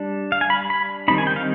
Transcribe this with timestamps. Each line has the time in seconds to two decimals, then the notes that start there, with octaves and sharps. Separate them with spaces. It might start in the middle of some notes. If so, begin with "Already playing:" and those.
Already playing: G3 D4
0.32 F5
0.41 G#5
0.50 B5
0.70 B5
1.08 D#3 G3 C4 D#4 B5
1.18 G#5
1.27 G5
1.36 F5